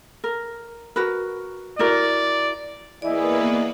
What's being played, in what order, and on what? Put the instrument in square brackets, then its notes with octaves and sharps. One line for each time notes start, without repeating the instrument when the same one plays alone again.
[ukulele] A#4
F#4 A#4 B4
[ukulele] E4 F#4 A#4 [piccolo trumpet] D5
[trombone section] E3 G#4 [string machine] A#3 B3 B4 [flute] E4 [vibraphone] D5 D#5